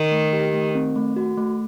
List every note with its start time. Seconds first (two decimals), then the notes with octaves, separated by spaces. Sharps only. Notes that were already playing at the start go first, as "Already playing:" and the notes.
Already playing: D#3
0.12 A3
0.33 G4
0.54 A3
0.75 C4
0.96 A3
1.16 F#4
1.37 A3